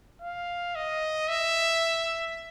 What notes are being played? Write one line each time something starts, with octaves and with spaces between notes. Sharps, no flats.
F5
D#5
E5